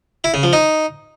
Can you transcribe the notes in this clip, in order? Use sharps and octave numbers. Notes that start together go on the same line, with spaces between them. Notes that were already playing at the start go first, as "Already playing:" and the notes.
E4
C#3
F3
D#4